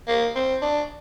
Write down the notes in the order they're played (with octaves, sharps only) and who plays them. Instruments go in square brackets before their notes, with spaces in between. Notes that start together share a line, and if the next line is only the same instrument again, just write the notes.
[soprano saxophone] A#3
C4
D4